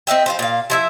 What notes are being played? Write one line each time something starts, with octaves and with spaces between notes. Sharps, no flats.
C4 D#5 E5 G5
F3 F4 C5
A#2 F5
F3 E4 E5